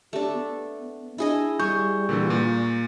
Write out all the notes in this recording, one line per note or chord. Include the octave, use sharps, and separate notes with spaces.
A3 D4 G4
B3
D4 E4 G#4 D#5
G3 G#4 C#6 G6
A#2 D3 E3
A#2 A#3